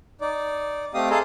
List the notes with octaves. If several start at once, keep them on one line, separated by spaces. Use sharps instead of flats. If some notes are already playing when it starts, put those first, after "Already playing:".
D#4 D5
A3 C4 G4 D#5 F5 D#6
G#4 A4 D#5 F5 A#5 C6